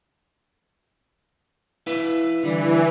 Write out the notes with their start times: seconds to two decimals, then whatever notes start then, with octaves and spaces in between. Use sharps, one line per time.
1.87 E4 B4 F5
2.43 D3 E3 G3